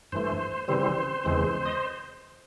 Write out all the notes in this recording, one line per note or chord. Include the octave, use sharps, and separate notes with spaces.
G2 E3 A3 C5
C#3 E3 G3 C4 C5
E2 C#3 E3 G#3 C4
D#5